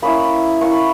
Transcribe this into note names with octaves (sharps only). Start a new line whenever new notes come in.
A#3 C#4 E4 B5 D#6
A#3 C#4 E4 C#6
B5